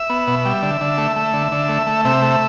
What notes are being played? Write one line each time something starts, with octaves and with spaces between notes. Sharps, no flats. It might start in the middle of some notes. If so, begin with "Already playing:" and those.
Already playing: E5
B3
B2
G3
D3
D3
A3
A3
D3
D3
A3
A3
C3 E5
A3